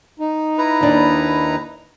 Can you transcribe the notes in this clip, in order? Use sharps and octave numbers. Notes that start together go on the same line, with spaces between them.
D#4
E4 B4 A#5
D#2 D4